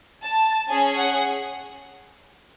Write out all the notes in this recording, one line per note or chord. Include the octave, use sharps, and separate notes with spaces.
A5
C#4 G#4 G#5
F#5